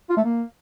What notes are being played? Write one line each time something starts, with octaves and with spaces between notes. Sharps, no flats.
F4
A3
A#3